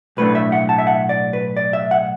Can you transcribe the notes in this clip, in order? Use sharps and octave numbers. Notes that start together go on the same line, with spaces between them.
B1 A2 A3 D4 B4
E5
F#5
A5
E5
F#5
D5
B4
D5
E5
F#5